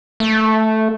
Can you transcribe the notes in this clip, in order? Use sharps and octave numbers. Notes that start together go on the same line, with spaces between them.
A3